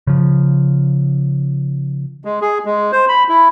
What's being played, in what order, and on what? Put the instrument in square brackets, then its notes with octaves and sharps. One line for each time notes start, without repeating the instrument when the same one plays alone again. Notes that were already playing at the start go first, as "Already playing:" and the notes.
[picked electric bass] C#3 F3
[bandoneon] G#3
G#4
G#3
C5
B5
E4